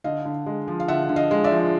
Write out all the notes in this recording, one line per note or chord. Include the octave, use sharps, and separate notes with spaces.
D3 D#5 F5
D3
G#3
F3
F5
D3 E5 F#5
D3
D#5 F5
G#3
D5 E5
F3